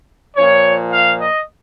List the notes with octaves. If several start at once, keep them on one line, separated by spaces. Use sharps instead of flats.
A#2 F3 C#5
F5
D#5